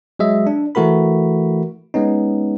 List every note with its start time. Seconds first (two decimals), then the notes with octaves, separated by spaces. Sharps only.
0.19 F#3 G#3 D#5 E5
0.47 D4
0.75 E3 A3 F#4 A#4 B5
1.94 G#3 B3 C#4 D#4